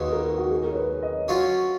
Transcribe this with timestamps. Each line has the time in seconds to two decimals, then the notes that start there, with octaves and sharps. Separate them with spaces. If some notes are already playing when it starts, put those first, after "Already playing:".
Already playing: D#2 C#3 G#3 F#4 B4
0.12 A#4
0.24 A#4
0.38 F#4
0.51 G#4
0.64 A#4
0.71 C#5
0.76 B4
0.89 C#5
1.03 D#5
1.14 C#5
1.27 F#3 C#4 F4 C#5